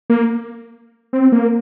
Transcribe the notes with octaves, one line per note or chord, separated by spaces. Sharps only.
A#3
C4
A#3